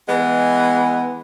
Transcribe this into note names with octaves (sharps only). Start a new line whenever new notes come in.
E3 G#3 B3